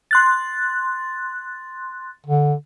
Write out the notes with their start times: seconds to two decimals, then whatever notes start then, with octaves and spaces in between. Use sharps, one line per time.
0.11 C6 F#6 A6
2.26 D3